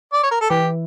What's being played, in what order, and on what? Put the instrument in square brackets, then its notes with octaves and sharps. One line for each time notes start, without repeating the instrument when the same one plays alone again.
[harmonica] D5
C#5
A#4
A4
[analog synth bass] E3 [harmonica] G4